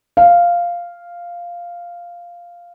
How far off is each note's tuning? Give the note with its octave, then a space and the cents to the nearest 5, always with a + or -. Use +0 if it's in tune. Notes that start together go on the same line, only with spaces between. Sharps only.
F5 -5